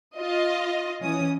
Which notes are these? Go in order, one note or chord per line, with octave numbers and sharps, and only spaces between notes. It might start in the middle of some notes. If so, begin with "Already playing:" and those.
F4 D#5
E3 C#4 D#6